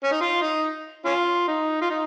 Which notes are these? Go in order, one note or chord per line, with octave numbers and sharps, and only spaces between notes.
C#4
D#4
F4
D#4
C#4 F4
D#4
F4
D#4